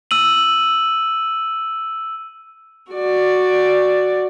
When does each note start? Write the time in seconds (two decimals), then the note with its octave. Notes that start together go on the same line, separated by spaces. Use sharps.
0.11 E6 D#7 F#7
2.92 F#4 D5